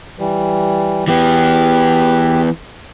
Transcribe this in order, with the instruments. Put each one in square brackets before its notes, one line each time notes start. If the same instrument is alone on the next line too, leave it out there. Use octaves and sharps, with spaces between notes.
[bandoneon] E3 G3
[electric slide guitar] E3 B3 [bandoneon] G4